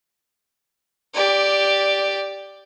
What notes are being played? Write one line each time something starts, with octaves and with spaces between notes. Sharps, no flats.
G4 D5